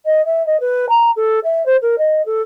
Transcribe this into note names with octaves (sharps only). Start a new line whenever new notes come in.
D#5
E5
D#5
B4
A#5
A4
E5
C5
A#4
D#5
A4